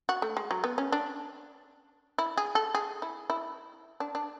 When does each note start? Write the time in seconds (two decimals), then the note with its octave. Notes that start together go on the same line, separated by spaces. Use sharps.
0.09 F#4
0.22 A3
0.37 G#3
0.51 F#3
0.64 B3
0.78 C#4
0.92 D4
2.18 E4
2.37 G#4
2.55 A4
2.75 G#4
3.02 E4
3.30 E4
4.00 D4
4.15 D4